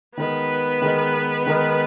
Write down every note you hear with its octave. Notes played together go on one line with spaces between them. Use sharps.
D#3 G#3 B3 D#4 A#4 B4 D#5
D#3 G#3 D#4 A#4 D#5
D#3 G#3 D#4 A#4 D#5